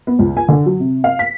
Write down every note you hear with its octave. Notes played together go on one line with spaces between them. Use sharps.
B3
C#2
G#5
D3
F#3
C3
F5
B6